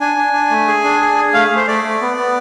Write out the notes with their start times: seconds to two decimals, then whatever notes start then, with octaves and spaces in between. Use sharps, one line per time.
0.01 D4 G#5
0.17 D4
0.33 D4
0.51 A3
0.67 G#4
0.84 D4
1.01 G#4
1.18 G#4
1.34 A3 F5
1.51 A3
1.56 C5
1.67 A3 D5
1.84 A3
2.01 B3
2.17 B3